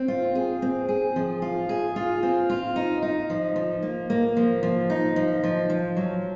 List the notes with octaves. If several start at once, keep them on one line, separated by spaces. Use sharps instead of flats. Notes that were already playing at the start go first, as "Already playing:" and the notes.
Already playing: C4
F4
G#4
C4
G#4
F3
F4
G#4
F4
C4
F4
D#4
D#4
F3
F3
A#3
A#3
F3
F3
D#4
F3
F3
F3
F#3